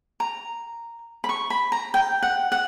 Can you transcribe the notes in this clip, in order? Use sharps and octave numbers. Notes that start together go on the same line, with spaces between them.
A#5
B5
C#6
B5
A#5
G5
F#5
F#5